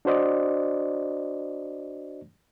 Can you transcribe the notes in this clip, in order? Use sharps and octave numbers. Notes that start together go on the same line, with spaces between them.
D4 F#4 C5 D5 D#5